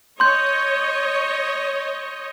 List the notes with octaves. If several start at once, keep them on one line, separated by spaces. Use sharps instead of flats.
C#5 D#5 C6 G6